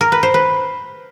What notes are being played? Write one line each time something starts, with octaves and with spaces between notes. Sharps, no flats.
A#4
B4
C5
B4